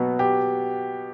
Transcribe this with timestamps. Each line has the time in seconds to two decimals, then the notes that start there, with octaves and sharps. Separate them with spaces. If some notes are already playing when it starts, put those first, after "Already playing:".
Already playing: B2 F#3 B3
0.19 G4